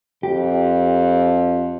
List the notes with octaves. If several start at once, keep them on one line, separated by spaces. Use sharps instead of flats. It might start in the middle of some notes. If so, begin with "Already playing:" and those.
F2 G4